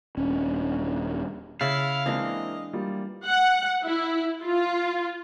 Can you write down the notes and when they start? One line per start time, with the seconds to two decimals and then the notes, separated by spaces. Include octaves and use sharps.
0.17 D#1 C#4 D4
1.61 C#3 E4 F5 A6
2.06 E3 G#3 A#3 C4 D4 E4 D#5
2.73 G3 A#3 F4
3.25 F#5
3.83 E4
4.43 F4